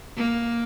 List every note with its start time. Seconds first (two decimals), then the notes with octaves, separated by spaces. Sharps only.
0.16 A#3